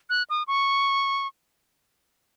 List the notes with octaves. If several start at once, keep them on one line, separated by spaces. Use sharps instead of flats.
F#6
D#6
C#6